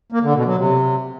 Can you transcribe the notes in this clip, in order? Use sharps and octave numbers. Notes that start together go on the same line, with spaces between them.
A#3
D3
B2
F#3
C3